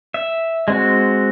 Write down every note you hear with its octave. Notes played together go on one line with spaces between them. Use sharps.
E5
G#3 C4 F#4